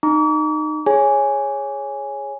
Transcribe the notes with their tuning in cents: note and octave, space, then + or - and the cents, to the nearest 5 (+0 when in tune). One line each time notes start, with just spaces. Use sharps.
D#4 -20 A#5 +0 D6 -45
G#4 +0 C#5 +0 G#5 +0